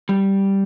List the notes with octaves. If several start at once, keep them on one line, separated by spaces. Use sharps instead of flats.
G3